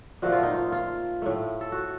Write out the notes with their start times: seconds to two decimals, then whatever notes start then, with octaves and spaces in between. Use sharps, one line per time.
0.22 A#2 F3 A3 F#4
0.32 F4
0.43 D#4
0.54 F4
0.72 F4
1.22 A2 A3
1.61 A4
1.72 F#4